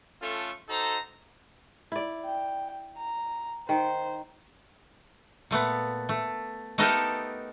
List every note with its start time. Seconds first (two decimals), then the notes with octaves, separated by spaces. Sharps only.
0.22 A3 C#4 F4 A4 C#6
0.69 D#4 F#4 A4 C5 A#5
1.92 E4 D5
2.25 G5
2.98 A#5
3.69 D#3 C5
5.51 A#2 A3 B3
6.09 A3
6.78 A3 B3 D#4 G4 A4 A#4